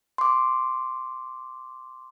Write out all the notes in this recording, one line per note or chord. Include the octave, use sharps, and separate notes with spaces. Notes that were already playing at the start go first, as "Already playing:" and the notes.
C6 D6